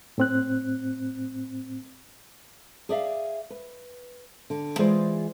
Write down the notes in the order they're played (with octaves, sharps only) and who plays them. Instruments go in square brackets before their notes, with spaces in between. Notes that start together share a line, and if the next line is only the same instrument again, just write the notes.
[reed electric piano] A2 C4 F#6
[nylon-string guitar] G#4 D5 E5 F5
B4
D3
E3 G#3 F4 G#4 C5 D5